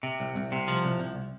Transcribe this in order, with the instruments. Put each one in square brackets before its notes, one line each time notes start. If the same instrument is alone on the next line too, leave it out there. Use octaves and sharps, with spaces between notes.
[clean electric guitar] C3
C2
C2
C3
F3
C2
C2